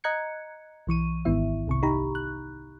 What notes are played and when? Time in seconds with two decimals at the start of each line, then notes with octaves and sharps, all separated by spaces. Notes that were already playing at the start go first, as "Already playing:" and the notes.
0.04 D#5 A#5 F#6 G#6 C#7
0.87 B1 E3 C#6 D#7
1.25 G#1 G#2 D#3 B3 E4 E5
1.67 C2 C3 C#6
1.83 D#4 G4 A#5 B5
2.15 F#6